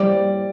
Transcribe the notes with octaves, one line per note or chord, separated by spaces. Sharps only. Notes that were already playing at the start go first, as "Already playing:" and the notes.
Already playing: G3 D5